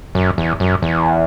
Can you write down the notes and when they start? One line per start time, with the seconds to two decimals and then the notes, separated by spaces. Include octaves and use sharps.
0.15 F#2
0.38 E2
0.60 F#2
0.82 E2